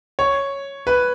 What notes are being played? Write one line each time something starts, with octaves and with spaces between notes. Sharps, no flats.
C#5
B4